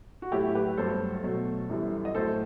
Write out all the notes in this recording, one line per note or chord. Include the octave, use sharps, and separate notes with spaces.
F#4
A2 F#3 A3 E4 G4
G4 B4
G2 F#3 A3 A4 C5
B2 F#3 A3
F#2 E3 G3
D#5
A2 F#3 A3 A4 C5